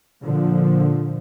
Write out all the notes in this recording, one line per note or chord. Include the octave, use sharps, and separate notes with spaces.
A#2 D3 F3